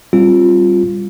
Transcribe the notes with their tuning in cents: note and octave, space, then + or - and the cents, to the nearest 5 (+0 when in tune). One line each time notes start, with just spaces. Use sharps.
G3 +0 C4 +30 F4 +0